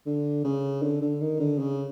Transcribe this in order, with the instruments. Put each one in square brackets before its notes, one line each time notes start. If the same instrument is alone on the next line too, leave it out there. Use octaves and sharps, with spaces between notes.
[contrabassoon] D3
C#3
D3
D3
D#3
D3
C#3